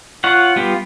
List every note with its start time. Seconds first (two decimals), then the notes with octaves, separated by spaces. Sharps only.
0.24 F4 C#5 F#5
0.56 G3 B3 F4 G4